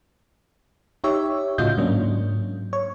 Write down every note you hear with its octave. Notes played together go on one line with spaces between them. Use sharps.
D#4 G4 C#5 E5
A2 C#3 F4 F#4 D#5 G6
G#2 F#3 A#3 C#4 D4
C#5